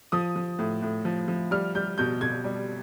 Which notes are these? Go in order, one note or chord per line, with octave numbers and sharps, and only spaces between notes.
F3 D#6
F3
A2
A2
F3
F3
G3 F6
G3 G6
B2 G6
B2 G#6
G3